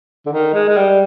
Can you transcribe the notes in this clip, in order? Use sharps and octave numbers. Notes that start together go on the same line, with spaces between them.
D3
D#3
G#3
G#3
G3